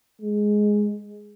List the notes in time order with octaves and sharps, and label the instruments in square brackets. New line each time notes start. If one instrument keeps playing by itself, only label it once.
[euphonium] G#3